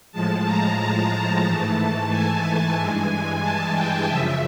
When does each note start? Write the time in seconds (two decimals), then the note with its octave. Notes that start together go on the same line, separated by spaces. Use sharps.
0.12 A2 F3 G#3 A5
0.45 A#5
0.78 A5
1.44 G#2 E3 A3
2.10 G#5
2.76 G2 E3 G#3
3.41 A5
3.74 G5
4.07 F#2 C#3 F3 E5